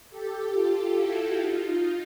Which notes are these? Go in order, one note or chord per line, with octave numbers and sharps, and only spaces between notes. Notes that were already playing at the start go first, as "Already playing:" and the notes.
G4 A4
F4 G4
E4 F#4
D#4 F4